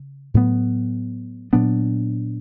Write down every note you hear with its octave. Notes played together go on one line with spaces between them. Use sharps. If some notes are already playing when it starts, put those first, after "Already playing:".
Already playing: C#3
A2 F#3 B3
A#2 F#3 B3 D4